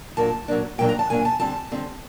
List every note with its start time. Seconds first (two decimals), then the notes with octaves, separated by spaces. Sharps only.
0.17 A#2 F#3 A#3 D4 A5
0.48 A#2 F#3 A#3 D4
0.78 A#2 F#3 A#3 D4 G5
0.89 A#5
0.99 A5
1.10 A#2 F#3 A#3 D4 G#5
1.25 A5
1.40 D3 G3 C4 A5
1.71 D3 G3 C4